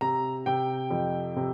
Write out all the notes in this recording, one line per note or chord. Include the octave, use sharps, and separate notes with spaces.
C3 A#5
C3 G5
F2
C3